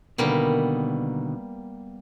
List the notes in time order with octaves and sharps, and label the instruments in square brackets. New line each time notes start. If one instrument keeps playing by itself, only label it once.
[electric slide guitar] B2 D3 D#3 [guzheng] G3 A#3 B3